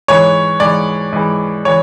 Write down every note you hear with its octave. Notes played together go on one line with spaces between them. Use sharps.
G#2 E3 C#5
G#2 E3 D5
G#2 E3
E3 C#5